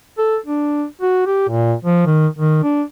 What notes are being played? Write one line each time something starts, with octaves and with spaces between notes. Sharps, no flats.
A4
D4
F#4
G4
A#2
F3
D#3
D#3
D4